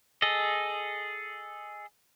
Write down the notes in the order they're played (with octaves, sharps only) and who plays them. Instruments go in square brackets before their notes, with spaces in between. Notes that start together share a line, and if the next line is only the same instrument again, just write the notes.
[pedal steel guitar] G#4 A4 D#5